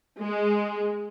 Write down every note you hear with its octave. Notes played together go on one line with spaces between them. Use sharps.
G#3